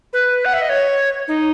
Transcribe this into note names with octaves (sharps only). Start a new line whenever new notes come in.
B4
F#5
E5
D#5
C#5
D#4